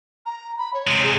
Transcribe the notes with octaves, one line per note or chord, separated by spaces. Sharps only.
A#5
B5
C#5
C3 G#3
G#4